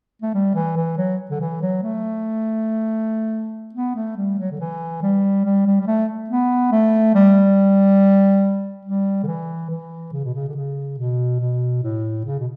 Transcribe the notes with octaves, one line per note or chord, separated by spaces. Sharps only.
A3
G3
E3
E3
F#3
D3
E3
F#3
A3
B3
A3
G3
F#3
D3
E3
G3
G3
G3
G3
A3
B3
A3
G3
G3
D3
E3
E3
C#3
B2
C#3
D3
C#3
B2
B2
A2
C#3
B2